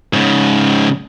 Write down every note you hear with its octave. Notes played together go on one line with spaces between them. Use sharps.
G#2 C#3